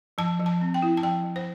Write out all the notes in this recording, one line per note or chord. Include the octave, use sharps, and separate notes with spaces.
F3 A5
F3
A5
C4
G5
E4
A5
F3 G5
F3
C5